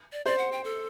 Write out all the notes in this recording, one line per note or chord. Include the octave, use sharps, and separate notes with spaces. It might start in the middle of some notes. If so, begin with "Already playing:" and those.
D5
C5 D5
F#5
G5
A4